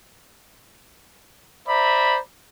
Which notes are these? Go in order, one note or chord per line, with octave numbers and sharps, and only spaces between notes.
C5 D5 E5 A#5 B5